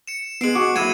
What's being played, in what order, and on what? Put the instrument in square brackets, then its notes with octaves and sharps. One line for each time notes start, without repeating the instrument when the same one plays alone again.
[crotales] C#7 E7
[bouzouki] G#3 D#5 [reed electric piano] B3 [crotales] C7 D7 F#7
[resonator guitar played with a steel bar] F#4 [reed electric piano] D6
[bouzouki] A2 [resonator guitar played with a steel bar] F#3 E4 [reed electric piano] A#3 [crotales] G#6 D#7 E7